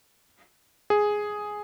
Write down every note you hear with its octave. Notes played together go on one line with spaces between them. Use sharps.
G#4